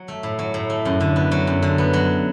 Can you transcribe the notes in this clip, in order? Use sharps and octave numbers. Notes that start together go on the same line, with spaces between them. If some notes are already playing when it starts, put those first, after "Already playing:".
Already playing: F#3
A3
A2
F#3
A2
A3
F#2
D3
B3
F#3
F#2
D3
B3
F#3